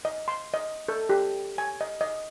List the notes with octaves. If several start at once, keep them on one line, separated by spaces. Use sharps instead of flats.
D#5
C6
D#5
A4
G4
G#5
D#5
D#5